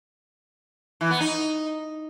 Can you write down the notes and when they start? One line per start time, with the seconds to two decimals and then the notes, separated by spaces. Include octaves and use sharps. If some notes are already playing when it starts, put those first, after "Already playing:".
1.01 E3
1.11 B3
1.20 D#4